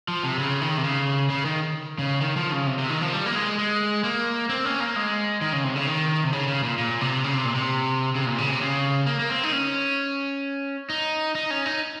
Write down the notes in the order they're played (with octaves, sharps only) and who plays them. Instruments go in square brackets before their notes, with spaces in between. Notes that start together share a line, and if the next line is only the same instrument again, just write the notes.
[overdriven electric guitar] F3
C3
C#3
D#3
C3
C#3
C#3
D#3
C#3
D#3
F3
C#3
C3
C3
D#3
F3
G3
A#3
G#3
G#3
A#3
C4
C#4
A#3
G#3
D#3
C#3
C3
C#3
D#3
C3
C#3
C#3
A#2
A#2
C3
C#3
C3
A#2
C3
C#3
C3
A#2
C#3
C3
C#3
A#3
A#3
C4
D#4
C#4
D#4
D#4
C#4
D#4